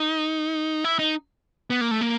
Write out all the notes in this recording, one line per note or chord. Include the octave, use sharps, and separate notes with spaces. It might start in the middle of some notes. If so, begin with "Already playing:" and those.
Already playing: D#4
E4
D#4
B3
A#3
A3
A#3